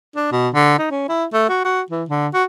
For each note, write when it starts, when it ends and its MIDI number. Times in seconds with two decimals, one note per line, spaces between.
0.16 0.28 62
0.32 0.48 47
0.54 0.78 50
0.79 0.87 63
0.91 1.04 61
1.09 1.25 64
1.33 1.45 57
1.49 1.60 66
1.65 1.81 66
1.90 2.04 52
2.09 2.28 50
2.34 2.44 66